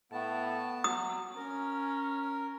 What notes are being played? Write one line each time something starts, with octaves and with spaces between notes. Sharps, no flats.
A2 B3 A5
F#3 D#6
C#4 A#4